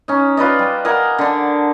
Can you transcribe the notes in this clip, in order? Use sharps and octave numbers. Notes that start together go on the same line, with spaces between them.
C#4 D#4
F4 B4 D5 D#5
G3
A#4 D#5 F#5 G#5
D3 D4